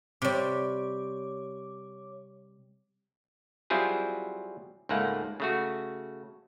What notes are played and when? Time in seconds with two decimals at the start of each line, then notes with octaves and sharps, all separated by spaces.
0.22 C3 G3 C#5 D6
3.70 F#3 G3 C4 E4 F4 G#4
4.89 C#2 G#2 A3 A#3 F#5
5.40 C#3 A3 F#4